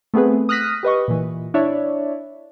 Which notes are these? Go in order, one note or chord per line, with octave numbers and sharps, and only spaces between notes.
A3 B3 C4 G#4 B4
D#6 F6 F#6 A#6 B6 D#7
G4 B4 D#5 C#6
A#2 E3
D4 E4 C#5 D5 E5